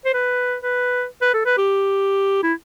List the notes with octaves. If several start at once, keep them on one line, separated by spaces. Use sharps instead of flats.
C5
B4
B4
B4
A4
B4
G4
E4